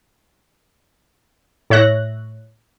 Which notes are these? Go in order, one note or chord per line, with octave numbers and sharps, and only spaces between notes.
A2 C#5 E5 F#6 A#6